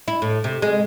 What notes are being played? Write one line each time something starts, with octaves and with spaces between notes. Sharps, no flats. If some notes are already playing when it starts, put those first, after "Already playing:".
E4
A2
C3
G#3